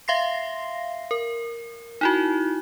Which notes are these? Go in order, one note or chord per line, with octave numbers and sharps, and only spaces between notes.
E5 F5 C6 A#6 C7
A#4
D#4 E4 F#4